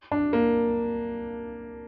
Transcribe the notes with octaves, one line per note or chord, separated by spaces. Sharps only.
D4
A#3